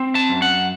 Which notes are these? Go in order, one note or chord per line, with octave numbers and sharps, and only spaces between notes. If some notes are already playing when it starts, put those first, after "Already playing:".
Already playing: C4
A5
F#2
F#5